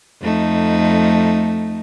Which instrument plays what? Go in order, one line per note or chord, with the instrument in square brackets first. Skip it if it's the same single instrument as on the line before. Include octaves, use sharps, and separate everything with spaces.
[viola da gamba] F2 A3 D#4